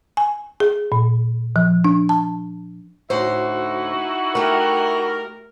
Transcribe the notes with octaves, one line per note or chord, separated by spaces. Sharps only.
G#5
G#4
A#2
F3
D4
A5
D2 A2 D#4 E4 F#4 C5
A3 G4 A#4